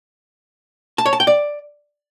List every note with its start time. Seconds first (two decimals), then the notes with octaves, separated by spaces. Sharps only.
0.98 A5
1.06 C#5
1.13 A5
1.20 G5
1.27 D5